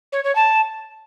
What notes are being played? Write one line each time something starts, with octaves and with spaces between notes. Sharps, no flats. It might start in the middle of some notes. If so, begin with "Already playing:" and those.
C#5
C#5
A5